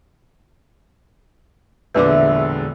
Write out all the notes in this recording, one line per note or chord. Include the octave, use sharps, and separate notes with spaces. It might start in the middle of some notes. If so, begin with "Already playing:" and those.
E1 A#1 D3 B4 E5 D6